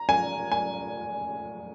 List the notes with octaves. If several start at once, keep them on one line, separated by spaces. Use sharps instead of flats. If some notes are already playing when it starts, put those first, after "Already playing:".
Already playing: A#5
G#5
G#5